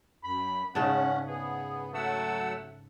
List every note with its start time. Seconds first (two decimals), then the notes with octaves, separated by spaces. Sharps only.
0.24 F#2 B5
0.75 G#2 C#3 C#4 D4 F#5
1.27 B3 G#4
1.94 F#3 A3 F#5 E6